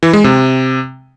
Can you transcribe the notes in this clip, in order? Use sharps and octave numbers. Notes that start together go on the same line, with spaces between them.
E3
G#3
C3